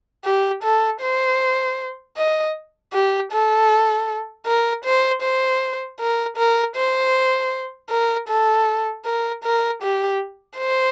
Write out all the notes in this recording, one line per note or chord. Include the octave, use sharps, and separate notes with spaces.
G4
A4
C5
D#5
G4
A4
A#4
C5
C5
A#4
A#4
C5
A#4
A4
A#4
A#4
G4
C5